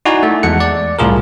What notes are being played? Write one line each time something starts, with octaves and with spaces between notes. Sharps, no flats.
D#4 E4 F#4 D5 G#5
A3
E2 G#3 A4 F#5 C#7
D5
C2 A2 F4 G#4 A#4